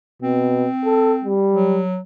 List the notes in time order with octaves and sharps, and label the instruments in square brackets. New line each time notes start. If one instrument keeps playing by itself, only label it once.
[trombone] B2 [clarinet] C4
[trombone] A4
G3
[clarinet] F#3